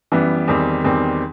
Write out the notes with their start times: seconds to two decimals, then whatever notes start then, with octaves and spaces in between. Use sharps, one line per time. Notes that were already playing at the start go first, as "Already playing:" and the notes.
0.12 F#2 E3 G3 B3
0.48 E2 D#3 G3 C4
0.84 E2 D#3 G3 C4